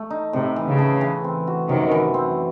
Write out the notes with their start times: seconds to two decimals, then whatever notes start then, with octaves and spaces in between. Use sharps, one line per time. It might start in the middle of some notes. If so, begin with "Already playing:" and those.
Already playing: A3
0.10 D#4
0.33 A2 C3
0.56 E3
0.67 C#3
0.79 A3
1.01 E3
1.24 C4
1.47 F#4
1.69 F#2 C3 D#3
1.91 E3
2.14 C4